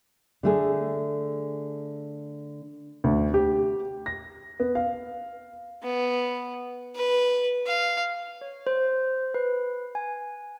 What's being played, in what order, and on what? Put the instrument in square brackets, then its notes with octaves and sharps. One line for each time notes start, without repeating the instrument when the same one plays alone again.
[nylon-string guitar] D3 A3 G#4
[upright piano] D2
G4
A#6
B3
F5
[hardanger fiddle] B3
B4
F5
[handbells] C#5
C5
B4
G#5